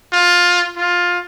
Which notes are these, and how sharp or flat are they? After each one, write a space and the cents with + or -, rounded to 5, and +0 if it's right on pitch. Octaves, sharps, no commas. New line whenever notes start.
F4 +15
F4 +15